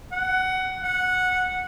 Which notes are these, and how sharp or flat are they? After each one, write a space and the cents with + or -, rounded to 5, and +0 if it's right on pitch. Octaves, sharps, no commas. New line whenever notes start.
F#5 +15
F#5 -10